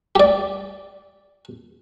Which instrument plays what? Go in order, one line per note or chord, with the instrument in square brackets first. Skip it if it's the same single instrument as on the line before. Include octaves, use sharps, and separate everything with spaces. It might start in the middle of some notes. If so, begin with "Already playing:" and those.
[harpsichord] G4 D5